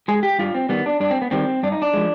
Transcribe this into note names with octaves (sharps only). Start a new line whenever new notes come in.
G#3 G#4
G4
G2 F4
C4
D#3 G3 B3
D4
G2 D4
C4
B3
D#3 G3 C4
G2 D4
D#4
D4
F3 G#3